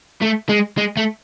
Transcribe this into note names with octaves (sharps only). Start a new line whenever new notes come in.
A3
G#3
G#3
A3